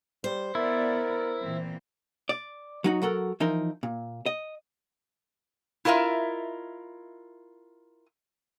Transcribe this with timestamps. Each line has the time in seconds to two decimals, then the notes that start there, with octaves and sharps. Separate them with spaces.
0.24 G3 C5
0.55 B3 E4 A#4 D5
1.41 A#2 E3 C4
2.29 D5
2.84 F#3 D#4 F#4
3.02 F#3 F#4 A4 A#4
3.40 E3 F3 D#4 A#4
3.83 A#2
4.26 D#5
5.85 E4 F4 A#4 D#5 E5